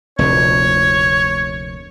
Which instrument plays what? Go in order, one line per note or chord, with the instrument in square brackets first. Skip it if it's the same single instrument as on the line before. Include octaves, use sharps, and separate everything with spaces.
[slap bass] F1 D2 A#2 [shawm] C#5